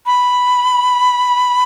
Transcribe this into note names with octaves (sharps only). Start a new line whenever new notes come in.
B5